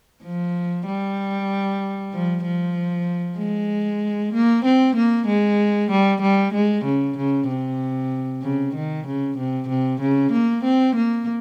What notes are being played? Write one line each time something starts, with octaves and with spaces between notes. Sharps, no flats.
F3
G3
F3
F3
G#3
A#3
C4
A#3
G#3
G3
G3
G#3
C#3
C#3
C3
C#3
D#3
C#3
C3
C3
C#3
A#3
C4
A#3